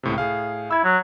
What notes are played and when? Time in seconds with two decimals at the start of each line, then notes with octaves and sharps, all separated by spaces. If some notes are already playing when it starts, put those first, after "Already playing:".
0.03 C#2 A2 C3
0.18 A2 G#4 F5
0.71 E4 E6 G#6
0.84 F#3